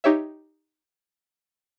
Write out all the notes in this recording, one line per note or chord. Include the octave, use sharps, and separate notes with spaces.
D#4 G4 C#5 E5